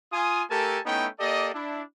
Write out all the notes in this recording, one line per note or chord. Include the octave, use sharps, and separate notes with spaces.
F4 G#5 D#6
A3 G4 A4 A#4 G#5 A5
A3 B3 C#4 D#4 E4 G5
A#3 G4 A4 D5 D#5
D4 E4